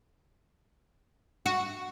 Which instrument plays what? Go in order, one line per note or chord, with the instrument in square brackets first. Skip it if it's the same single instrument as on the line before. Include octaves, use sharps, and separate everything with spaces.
[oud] F#4